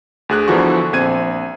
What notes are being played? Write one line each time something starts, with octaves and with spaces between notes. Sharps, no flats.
D2 G#4 F#6
E2 D3 E3 F3 F#4 C#6
A#1 C4 G#6 D#7